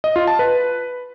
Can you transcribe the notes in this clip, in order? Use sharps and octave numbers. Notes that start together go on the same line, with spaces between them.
D#5
F4
A5
B4